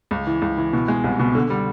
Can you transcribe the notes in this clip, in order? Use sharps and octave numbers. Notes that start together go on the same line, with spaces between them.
C#2
E3
C#2
E3
B2
G#3
C2
B2
D3
G3